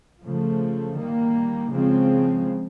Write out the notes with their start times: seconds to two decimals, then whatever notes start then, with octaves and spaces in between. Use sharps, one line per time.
0.21 C#3 F3 A3
0.96 D#3 G3 A#3
1.71 C#3 F3 G#3 C4